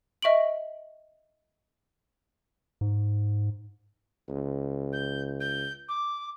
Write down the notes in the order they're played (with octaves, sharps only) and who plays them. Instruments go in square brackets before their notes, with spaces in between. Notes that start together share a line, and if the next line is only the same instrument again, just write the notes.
[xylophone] D#5 E5 C#6 D7 F#7
[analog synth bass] G#2
[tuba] C#2
[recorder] G6
G6
D6